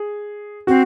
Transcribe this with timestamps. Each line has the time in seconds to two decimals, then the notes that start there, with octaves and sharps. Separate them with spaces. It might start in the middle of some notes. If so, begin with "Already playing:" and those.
Already playing: G#4
0.67 C4 F#4